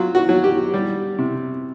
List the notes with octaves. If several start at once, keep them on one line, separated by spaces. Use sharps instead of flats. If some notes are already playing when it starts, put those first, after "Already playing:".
Already playing: F#3 F4
F#4
F#3
G4
G3
C3